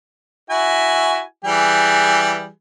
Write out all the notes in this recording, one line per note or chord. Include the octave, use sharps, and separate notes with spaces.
E4 F#4 G#5
E3 G3 G#4